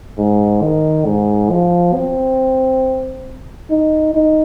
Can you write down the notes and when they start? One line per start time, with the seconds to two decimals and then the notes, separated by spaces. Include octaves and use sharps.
0.18 G#2
0.62 D#3
1.06 G#2
1.50 F3
1.94 C4
3.70 D#4
4.15 D#4